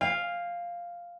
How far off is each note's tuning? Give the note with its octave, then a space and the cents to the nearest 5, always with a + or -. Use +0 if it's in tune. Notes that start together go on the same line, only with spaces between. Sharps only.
F5 +0 G#5 -45